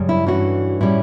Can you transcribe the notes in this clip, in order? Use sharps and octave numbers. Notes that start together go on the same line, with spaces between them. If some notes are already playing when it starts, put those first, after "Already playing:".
Already playing: F#2 C#3 G3
E4
G2 E3 A3 C#4 F#4
A2 G3 C#4 E4